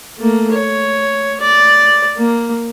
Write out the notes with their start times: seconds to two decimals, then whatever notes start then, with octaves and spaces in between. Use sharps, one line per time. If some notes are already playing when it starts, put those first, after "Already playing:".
0.18 A3 A#3
0.52 C#5
1.41 D5
2.17 A#3